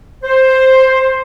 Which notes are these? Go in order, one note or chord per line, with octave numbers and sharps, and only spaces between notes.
C5